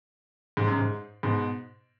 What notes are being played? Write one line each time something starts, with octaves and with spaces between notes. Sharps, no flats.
G#2
F#2
G#2
G#2 B2